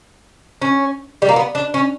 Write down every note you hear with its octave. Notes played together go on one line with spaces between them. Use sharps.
C#4
G3
A#3
B3
D4
C#4